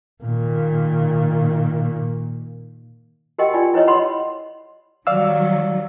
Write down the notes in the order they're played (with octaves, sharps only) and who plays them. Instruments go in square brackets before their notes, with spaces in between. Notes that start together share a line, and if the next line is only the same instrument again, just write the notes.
[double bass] A#2 D#3
[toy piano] F#4 G4 A#4 D#5 F#5 G5
F4 D5 G5 G#5
E4 B4 C#5 D#5
D#5 F#5 B5 C6
[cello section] D#3 F#3 G3 [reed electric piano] D5 F5 E6